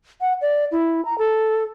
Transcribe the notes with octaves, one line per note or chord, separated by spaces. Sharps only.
F#5
D5
E4
A#5
A4